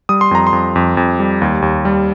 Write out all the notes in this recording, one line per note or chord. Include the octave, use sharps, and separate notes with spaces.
G3 D#6
C6
F2 A#5
C6
F2
F2
F2
G3
D#2
D#2
G3